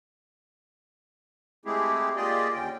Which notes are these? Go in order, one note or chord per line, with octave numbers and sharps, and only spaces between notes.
G#3 A3 C4 E4 G4 G#4
A#3 F4 G4 G#4 D5 D#5
D#2 D3 C#4 G5